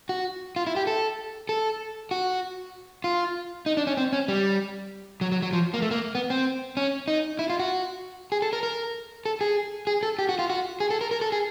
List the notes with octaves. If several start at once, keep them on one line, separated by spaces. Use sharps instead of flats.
F#4
F4
E4
G4
A4
A4
F#4
F4
D#4
D4
C#4
C4
C#4
G3
F#3
F#3
F#3
F3
A#3
A3
A#3
B3
C4
C#4
D#4
E4
F4
F#4
G#4
A4
A#4
A#4
A4
G#4
G#4
A4
G4
F#4
F4
F#4
G#4
A4
A#4
A#4
A4
G#4